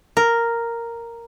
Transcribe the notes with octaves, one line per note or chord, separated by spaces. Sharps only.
A#4